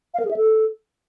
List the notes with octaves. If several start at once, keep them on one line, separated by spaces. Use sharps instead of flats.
F5
A#4
G#4
E5
A4